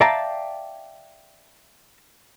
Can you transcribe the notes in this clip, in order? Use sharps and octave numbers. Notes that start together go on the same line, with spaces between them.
D5 E5 F5 G5 A5 A#5